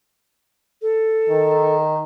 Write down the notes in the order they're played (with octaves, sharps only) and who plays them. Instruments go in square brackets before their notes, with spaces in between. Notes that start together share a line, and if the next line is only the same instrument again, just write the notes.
[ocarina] A4
[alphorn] D#3